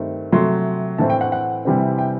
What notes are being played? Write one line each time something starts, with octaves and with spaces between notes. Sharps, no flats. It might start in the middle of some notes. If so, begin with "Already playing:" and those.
Already playing: G2 D#3 A3 C4
C3 F#3 A3 C6
A2 E3 A3 C4 A5
G5
F#5
F#5
C3 E3 G3 C4
G5